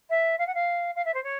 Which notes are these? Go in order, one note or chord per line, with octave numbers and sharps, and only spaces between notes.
E5
F5
F#5
F5
F5
E5
C5
C#5